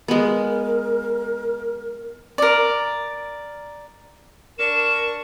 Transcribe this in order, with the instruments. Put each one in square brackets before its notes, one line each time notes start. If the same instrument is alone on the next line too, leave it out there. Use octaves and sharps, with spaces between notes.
[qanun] G#3 B3 [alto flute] A#4
[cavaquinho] A#4 D5
[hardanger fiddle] D4 C#6 [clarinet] A#4 [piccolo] E7